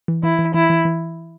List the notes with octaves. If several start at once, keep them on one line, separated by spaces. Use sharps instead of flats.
E3
E3 E4
E3
E3 E4
E3
E3